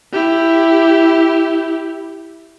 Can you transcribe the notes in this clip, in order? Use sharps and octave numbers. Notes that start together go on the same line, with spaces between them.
E4 G4